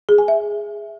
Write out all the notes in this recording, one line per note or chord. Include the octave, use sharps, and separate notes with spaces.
G#4
G#5
E5